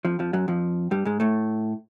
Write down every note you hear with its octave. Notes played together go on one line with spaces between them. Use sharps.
F2 F3
F2 F3
F#2 F#3
F2 F3
G2 G3
G#2 G#3
A2 A3